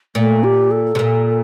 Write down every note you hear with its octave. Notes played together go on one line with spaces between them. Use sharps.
A#2 A3
G4
A4
C3
A#2